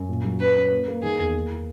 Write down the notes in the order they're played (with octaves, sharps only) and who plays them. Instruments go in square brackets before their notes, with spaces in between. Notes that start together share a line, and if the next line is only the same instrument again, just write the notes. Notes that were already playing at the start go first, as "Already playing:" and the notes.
Already playing: [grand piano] F#2
A#2
F#3
[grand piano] C#4 [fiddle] B4
[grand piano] C#4
A#3
A#3
[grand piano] D#3 [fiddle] G#4
[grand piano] E2
A#3
E4